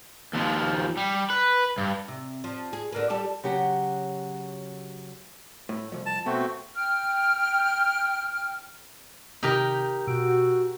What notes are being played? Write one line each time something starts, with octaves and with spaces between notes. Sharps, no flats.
D#2 F3
G3
B4
G2
C3
F3
G#4
D3 A#3 B4
G3 G4 A4
C#3 F#3 G4 F#5
A2
C2 F2
A5
B2 A3 C4 F#4
G5 F6
C3 D#3 D#4 G4 A#4
B2 F#4 E6 D7